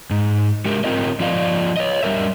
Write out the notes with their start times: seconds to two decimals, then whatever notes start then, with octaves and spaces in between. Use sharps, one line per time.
0.11 G#2
0.65 G#3 F#4 G4 A#4
0.84 C4 F4 A#4 D#5
1.20 F3 F4 D5 D#5 F5
1.77 C#5 D#5
2.03 G3 D4 A#4 E5